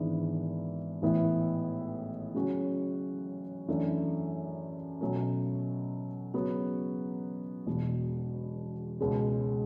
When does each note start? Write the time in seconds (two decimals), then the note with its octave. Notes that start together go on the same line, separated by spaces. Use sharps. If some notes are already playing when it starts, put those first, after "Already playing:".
Already playing: G#1 G#2 E3 B3 D4
1.02 A1 A2 E3 B3 E4
2.35 C#3 F#3 C#4 F#4 C#5
3.68 F#2 E3 A3 D4
5.01 B2 F#3 A3 C#4
6.34 C#3 F#3 B3 F#4
7.67 E1 E2 B2
9.00 C#2 B2 G#3 C#4 G#4